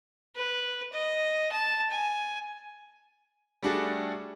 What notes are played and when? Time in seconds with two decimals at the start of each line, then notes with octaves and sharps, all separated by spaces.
0.36 B4
0.93 D#5
1.52 A5
1.90 G#5
3.63 G3 A3 D4 F#4 G#4 A4